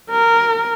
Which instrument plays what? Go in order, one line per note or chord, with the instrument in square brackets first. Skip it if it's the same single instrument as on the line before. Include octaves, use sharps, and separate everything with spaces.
[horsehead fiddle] A#4